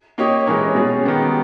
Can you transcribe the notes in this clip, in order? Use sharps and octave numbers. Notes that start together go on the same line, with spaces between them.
A#3 D#4 G4 C#5
E3 G#3 D#4 A#4 C#5
B2 G3 C#4 G#4
D#3 G#3 B3 G4